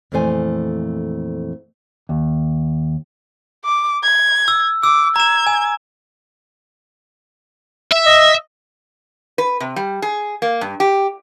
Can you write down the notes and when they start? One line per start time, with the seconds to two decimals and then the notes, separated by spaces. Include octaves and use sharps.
0.12 F2 A#2 E3 A3 C5 G#5
2.09 D#2
3.65 D6
4.04 G#6
4.48 E6
4.83 D6 E6
5.16 A#5 G#6 E7
5.47 G#5
7.91 E5
8.06 D#5
9.38 B4
9.60 C3
9.76 G3
10.02 G#4
10.42 A#3
10.61 G2
10.80 G4